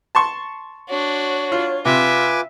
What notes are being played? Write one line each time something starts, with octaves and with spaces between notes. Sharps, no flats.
A5 C6 C#6
D4 F#4 C#5
F4
C3 F4 B4 E5 G#5 D6